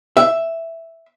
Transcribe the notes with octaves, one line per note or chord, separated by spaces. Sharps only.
E5